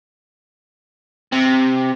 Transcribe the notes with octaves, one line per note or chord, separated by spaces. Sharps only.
C3